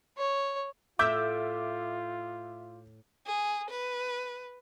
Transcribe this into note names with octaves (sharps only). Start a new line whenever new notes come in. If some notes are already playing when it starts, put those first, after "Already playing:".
C#5
A2 F4 E5 D6 G6
G#4
B4